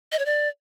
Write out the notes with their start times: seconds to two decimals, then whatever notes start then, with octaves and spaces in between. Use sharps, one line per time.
0.12 D#5
0.19 C#5
0.25 D5